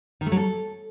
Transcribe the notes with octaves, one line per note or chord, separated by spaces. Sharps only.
D#3
A3
F#3
A4